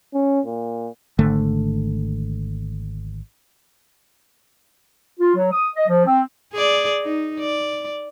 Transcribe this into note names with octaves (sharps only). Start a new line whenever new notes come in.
C#4
A#2
G#1 D3 A3
F4
F#3
D#6
D#5
F3
C4
G#4 D5
D#4
D5